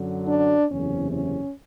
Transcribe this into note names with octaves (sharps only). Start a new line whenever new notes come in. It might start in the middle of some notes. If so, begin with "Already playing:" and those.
Already playing: F#2 D3 F#3
D4
F#1 E2 C3 C#4
C#4